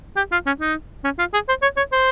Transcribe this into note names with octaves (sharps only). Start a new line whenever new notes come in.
G4
F4
C#4
D#4
C#4
F4
G#4
C5
C#5
C#5
C5